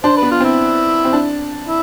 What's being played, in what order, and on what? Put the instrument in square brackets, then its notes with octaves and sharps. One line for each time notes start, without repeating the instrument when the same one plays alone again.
[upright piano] D4 [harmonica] C5
[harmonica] B4
[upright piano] B3
[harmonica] F4
[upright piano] C4 [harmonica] E4
[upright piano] C4
D4
[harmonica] E4